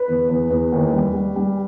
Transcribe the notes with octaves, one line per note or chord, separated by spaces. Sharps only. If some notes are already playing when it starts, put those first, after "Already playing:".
Already playing: B4
E2
E2
E2
D#2
G3
G3
G3